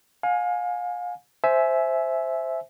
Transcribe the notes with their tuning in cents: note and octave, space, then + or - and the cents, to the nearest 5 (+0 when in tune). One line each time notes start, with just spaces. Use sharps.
F5 +35 G#5 +0
C5 +0 E5 +0 G#5 +20